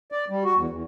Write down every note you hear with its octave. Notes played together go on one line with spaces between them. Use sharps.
D5
G3
F#4
E2
E2